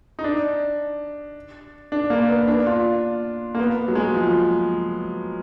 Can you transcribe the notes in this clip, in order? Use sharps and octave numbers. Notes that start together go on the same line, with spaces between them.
D#4
D4
D4
A#3
B3
D4
F4
A#3
B3
F#3
G#3
F3